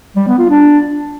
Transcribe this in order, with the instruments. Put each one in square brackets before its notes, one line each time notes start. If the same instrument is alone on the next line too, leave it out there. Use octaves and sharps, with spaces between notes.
[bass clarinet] G3
B3
F4
D4